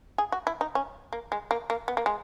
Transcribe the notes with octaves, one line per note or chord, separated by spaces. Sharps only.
G#4
F#4
E4
D#4
C#4
A#3
G#3
A#3
A#3
B3
A#3
G#3